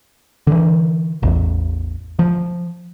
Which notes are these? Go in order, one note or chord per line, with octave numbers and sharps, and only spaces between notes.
D3 E3
A1 E2
F3